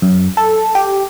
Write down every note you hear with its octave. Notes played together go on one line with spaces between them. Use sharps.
F#2
A4
G4